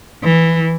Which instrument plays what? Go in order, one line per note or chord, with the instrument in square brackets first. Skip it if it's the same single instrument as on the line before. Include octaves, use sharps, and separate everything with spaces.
[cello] E3